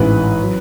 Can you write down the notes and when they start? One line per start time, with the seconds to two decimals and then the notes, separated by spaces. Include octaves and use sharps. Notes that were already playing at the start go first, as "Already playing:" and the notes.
Already playing: A1 G#2 E3 B4
0.43 F#3